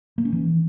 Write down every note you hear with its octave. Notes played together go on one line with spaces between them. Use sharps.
A#3
C#4
E3